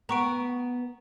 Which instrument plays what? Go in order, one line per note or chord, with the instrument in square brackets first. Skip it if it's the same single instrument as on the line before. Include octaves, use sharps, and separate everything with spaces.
[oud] B3 [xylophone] A#5 C#6 D7